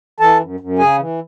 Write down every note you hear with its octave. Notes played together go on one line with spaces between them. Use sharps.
E3 A4 A5
F#2
F#2
C#3 G#4 G#5
E3